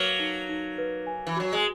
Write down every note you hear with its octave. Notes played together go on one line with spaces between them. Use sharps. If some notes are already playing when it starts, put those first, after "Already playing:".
Already playing: F#3 A#3 B4
D#4
D#4
B4
G#5
E3
F#3 F#4
G#3